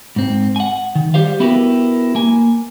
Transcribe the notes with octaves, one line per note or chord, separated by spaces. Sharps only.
G#2 C4
F#5 G#5
D#3
G3 G4 C5 F5
B3 E4 F#4 G4 A#4 B4
A#3 G#5